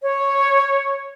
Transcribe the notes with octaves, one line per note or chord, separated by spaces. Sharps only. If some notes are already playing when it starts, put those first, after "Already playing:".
C#5